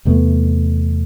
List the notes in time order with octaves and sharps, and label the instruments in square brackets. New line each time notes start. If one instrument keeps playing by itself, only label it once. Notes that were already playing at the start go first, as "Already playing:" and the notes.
[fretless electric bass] E2 C3 A3 B3